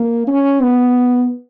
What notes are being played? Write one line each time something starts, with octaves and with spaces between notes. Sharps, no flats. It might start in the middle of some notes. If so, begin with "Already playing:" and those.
Already playing: A#3
C#4
B3